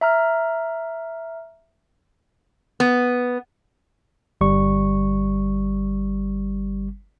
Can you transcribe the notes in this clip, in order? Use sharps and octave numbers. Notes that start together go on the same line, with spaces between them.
E5 A#5 F6
B3
G1 G3 C#6